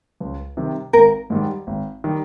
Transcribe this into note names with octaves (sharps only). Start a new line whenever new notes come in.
C#2
C3 D#3 G3
G#1 A#4
G#2 D#3 G3
G#1
D#3 G3